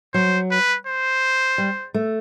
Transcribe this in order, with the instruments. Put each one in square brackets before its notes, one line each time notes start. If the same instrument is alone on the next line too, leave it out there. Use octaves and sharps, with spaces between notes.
[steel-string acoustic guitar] F#3 [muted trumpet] C5
[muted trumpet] B4
C5
[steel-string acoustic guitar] G3
A3